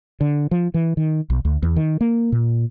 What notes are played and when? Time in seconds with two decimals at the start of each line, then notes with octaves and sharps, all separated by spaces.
0.21 D3
0.51 F3
0.74 E3
0.97 D#3
1.30 B1
1.45 D2
1.63 E2
1.76 D#3
2.01 A#3
2.32 A#2